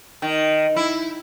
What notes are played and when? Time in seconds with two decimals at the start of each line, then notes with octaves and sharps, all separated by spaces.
0.22 D#3
0.76 E4